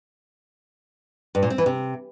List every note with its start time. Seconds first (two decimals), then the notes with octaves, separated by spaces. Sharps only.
1.35 G2
1.43 A#2
1.50 C4
1.58 E3
1.66 C3